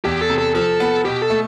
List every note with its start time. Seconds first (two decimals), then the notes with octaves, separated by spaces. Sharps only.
0.05 E2 G4
0.21 A4
0.30 C3
0.38 A4
0.55 F3 A4
0.80 B3
1.05 B2 G4
1.22 A4
1.30 A3